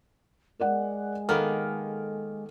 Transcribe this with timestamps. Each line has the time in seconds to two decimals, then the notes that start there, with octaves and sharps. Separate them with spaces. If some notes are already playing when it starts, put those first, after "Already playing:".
0.59 G#3 A#4 D5 F#5
1.29 D#3 A#3 B3 A4 F6